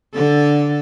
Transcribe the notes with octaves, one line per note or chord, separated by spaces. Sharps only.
D3 A4